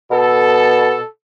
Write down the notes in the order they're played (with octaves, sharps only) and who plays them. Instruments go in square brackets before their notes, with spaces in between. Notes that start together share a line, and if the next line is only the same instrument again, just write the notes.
[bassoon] B2 [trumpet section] A4